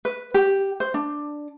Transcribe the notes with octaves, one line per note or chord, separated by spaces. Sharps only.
B4
G4
C5
D4